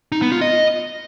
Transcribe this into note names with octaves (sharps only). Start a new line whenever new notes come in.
D#4
B3
F4
D#5